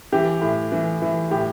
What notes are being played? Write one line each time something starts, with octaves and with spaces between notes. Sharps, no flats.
E3 G4
A2
E3
E3
A2 G4